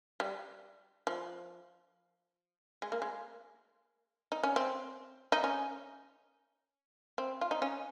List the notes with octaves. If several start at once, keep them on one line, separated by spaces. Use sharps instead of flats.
G3
F3
G#3
A#3
G#3
D#4
C#4
C4
D#4
C#4
C4
F4
D#4
C#4